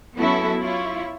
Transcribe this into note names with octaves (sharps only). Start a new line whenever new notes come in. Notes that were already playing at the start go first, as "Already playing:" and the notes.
F#3 B3 C#4 E4 F#4 A4
E4 F4 C#5